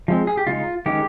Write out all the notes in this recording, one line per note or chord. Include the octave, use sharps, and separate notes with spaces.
F3 G#3 C4
G#4
G4
C#3 G#3 D#4 F4
D#3 G#3 C#4 G4